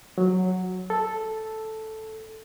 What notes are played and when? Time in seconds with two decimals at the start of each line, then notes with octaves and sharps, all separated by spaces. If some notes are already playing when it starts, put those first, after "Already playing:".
0.18 F#3
0.90 A4